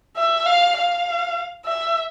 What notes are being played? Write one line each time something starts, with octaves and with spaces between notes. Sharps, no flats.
E5
F5
F5
E5